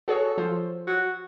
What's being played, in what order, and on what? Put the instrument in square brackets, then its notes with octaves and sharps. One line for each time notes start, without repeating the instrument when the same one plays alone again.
[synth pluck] F#4 G#4 C#5 [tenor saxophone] A4
[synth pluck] F3 F4 C5
[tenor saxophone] F#4